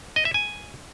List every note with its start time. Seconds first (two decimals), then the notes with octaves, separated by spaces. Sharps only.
0.16 D#5
0.25 E5
0.34 G#5